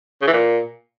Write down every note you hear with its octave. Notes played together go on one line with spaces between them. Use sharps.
C#3
E3
A#2